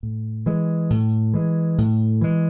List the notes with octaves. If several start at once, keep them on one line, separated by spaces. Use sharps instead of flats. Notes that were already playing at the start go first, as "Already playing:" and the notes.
A2
E3 G#3
A2
E3 G#3
A2
E3 G#3